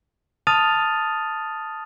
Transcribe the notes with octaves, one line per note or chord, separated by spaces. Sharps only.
A5 D#6 F6 A6 D#7 F7